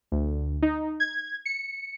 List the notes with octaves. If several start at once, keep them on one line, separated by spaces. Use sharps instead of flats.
D2
D#4
G#6
C#7